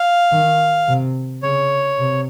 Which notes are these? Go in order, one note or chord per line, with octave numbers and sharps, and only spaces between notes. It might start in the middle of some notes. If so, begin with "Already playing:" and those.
Already playing: F5
D#3
C3
C#3 C#5
C3